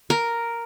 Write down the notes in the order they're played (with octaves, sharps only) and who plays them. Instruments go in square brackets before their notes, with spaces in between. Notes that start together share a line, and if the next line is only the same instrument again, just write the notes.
[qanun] A#4